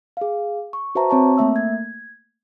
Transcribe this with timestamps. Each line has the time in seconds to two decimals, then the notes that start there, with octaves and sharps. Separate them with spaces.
0.17 G#4 F5
0.73 C#6
0.95 F#4 B4 C5 E5 A5 A#5
1.10 C4 C#5 A5 C#6
1.38 A3 A#3 E5 E6
1.56 G#6